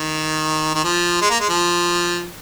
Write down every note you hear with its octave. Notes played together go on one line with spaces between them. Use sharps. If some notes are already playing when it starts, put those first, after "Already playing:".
Already playing: D#3
D#3
F3
G#3
A#3
G#3
F3